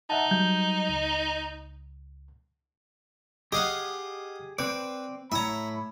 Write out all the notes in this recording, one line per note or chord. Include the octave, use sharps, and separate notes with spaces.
D#4 E5 F#5 A5
F#3 G3 G6
C#2
G4 G#4 D#5 F5 F#5
C4 B4 C5 D5
A2 E4 C#5 E5 A#5 B5